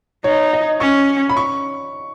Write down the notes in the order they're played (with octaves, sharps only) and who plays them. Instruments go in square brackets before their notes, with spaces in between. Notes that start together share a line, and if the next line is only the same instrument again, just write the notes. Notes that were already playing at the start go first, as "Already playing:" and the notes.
[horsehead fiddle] D#4 [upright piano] C#5
[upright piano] D#5
[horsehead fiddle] C#4 [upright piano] C#6
[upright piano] B5
C#6